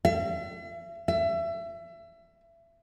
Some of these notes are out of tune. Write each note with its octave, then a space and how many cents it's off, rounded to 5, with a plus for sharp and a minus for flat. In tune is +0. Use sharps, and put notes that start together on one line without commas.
E5 +40
E5 +30